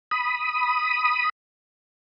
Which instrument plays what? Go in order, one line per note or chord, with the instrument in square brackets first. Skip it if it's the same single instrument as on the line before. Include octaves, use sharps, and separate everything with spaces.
[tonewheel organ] B5 D#6